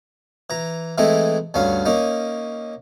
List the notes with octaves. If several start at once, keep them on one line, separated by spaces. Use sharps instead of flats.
E3 A#5
E3 G#3 A3 C4 D#4 E4
D2 G2 C#4 F5
A#3 C#4 D#4